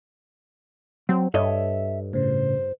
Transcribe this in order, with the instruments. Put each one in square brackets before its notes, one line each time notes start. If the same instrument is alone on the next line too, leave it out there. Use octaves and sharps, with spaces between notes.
[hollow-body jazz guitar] F#3 [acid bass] C4
[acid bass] G2 [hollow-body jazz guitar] A4 C#5 D#5 [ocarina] E5
[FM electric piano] A2 C#3 [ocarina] C5